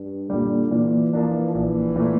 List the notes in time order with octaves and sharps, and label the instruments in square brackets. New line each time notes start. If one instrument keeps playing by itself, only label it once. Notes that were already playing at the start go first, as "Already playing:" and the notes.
Already playing: [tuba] G2
[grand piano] A#2 G3 [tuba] D3
[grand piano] A#2 [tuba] E3
[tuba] E3 [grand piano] F3 A#3 D4
[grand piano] A#1 [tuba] E3
[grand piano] A#2 A3